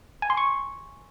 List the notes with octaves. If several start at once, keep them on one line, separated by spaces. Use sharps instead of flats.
G#5
C6
C#6